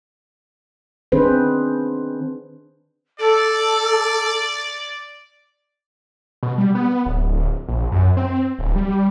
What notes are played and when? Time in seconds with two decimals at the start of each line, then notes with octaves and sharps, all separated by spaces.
1.12 D#3 C4 D4 G#4 B4 C5
3.20 A4 D5
6.43 B2
6.58 G3
6.75 B3
7.06 D1
7.68 A#1
7.92 F#2
8.17 C4
8.59 D1
8.76 G3